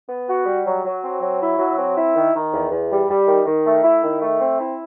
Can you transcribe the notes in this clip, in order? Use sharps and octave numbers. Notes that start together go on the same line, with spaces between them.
B3
F#4
G3
F#3
F#3
C4
F#3
E4
F#3
C4
E4
D#3
D#3
E2
E2
G3
G3
D#3
D#3
A3
E4
D#3
A3
C4
E4